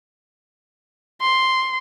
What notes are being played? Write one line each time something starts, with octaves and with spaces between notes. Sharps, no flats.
C6